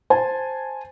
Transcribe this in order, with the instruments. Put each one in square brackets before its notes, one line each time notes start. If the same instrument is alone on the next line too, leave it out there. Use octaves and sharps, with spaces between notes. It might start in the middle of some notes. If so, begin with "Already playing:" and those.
[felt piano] C5 G#5 A5